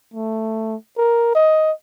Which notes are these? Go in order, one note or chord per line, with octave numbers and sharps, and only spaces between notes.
A3
A#4
D#5